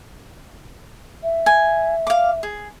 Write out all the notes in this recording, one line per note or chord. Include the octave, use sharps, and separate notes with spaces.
E5
G#5
F5 D6
G#4